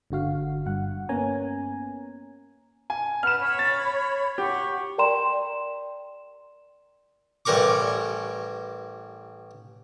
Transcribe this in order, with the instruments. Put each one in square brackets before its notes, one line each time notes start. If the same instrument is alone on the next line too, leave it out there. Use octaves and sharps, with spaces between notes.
[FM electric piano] G1 D3 F#4 F5
G2 F#5
A#3 B3 C#4 G#5 A#5
[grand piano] G#5
[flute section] B4 F#5 [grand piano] F6 E7
[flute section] C#5 B5
[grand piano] A6
[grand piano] G4 [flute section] F#5 C#6
[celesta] A#4 D5 G5 A#5 C6 E7
[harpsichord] A1 E3 G3 A#4 C#6 D6